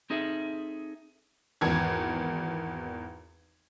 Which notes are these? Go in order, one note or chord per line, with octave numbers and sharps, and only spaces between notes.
C4 D#4 G#4 A4 E5
G#1 E2 G#6